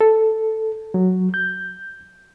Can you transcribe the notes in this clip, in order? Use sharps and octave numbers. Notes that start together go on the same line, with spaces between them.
A4
F#3
G6